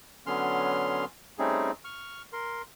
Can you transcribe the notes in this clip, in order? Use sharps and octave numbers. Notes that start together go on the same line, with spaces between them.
D3 F#3 B3 C#4 C6 F6
G3 A3 C4 C#4 D#4 G#4
C#6 F6
A#4 C6